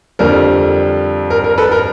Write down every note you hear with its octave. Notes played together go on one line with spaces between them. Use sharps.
F2 D3 G3 A#4
A#4
A#4
A4 B4
A#4